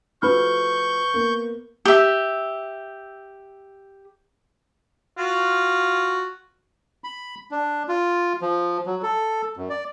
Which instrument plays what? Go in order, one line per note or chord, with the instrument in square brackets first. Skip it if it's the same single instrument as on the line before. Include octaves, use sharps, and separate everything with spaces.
[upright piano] F3 A3 F#4 [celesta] B4 B5 F6 [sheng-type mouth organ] C#6 G6
[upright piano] A#3 B3
[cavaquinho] G4 E5
[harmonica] F4 F#4
[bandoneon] B5
D4
F4
F3
F#3
A4
F#2
D5